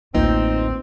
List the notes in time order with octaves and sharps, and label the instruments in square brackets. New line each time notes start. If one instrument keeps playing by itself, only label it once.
[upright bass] A1 D2 [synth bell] A#3 F4 B4 [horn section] C4 [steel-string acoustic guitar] D#4